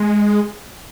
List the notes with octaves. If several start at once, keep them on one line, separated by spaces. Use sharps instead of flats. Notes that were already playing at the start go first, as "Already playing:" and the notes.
Already playing: G#3